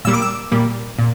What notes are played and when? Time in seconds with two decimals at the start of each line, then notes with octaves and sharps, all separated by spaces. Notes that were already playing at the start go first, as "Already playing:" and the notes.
0.05 A#2 G3 A#3 E6
0.14 D6
0.22 E6
0.52 A#2 G3 A#3
0.99 A#2